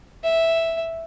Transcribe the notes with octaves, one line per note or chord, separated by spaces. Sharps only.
E5